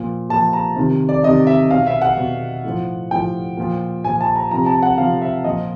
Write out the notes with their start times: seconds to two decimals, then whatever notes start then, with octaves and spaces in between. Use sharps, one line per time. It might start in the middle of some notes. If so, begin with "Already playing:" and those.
Already playing: A#2 F3
0.29 A#2 F3 A5
0.53 A#5
0.76 C3 D#3
1.09 D5
1.23 C3 D#3 D#5
1.47 E5
1.70 B2 F5
1.87 E5
2.01 F#5
2.17 B2
2.64 A2 F3
3.11 A2 F3 G5
3.57 A#2 F3
4.04 A#2 F3 G#5
4.21 A5
4.36 A#5
4.51 C3 F3 A#5
4.66 A5
4.83 F#5
4.98 C3 F3 F5
5.21 E5
5.44 A#2 F3 D#5